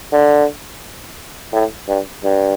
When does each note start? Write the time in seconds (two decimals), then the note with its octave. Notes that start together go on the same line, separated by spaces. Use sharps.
0.13 D3
1.53 A2
1.88 G2
2.24 G2